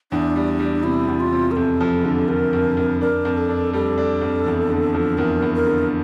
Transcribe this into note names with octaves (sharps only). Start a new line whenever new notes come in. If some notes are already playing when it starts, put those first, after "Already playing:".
E2 D4
G3
G3
C3 E4
E2
F4
C3
A#4
F2 A4
F3
D3
D3 A#4
F2
F2
D4 A#4
F2
A4
D4
G3 A4
D4
F2
E2
D3
F3
E2 A#4
E2
A#4
D3